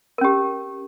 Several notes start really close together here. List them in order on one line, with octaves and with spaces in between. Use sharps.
A#4 C#4 G4